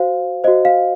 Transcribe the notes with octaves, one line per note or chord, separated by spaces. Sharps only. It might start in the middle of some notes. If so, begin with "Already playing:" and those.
Already playing: F#4 C5 F5
F#4 C5 D#5
F5